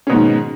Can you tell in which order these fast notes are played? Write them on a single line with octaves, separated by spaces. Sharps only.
C#4 B2 G#2 D#3